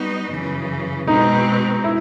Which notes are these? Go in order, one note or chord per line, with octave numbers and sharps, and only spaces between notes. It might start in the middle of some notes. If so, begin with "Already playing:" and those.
Already playing: G3 B3 D#4 F#4
F#2 C#3 E3
B2 G#3 C4 D#4
E4